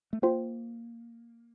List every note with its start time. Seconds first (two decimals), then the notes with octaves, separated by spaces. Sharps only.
0.13 A3
0.22 A#3 F4 C5 G5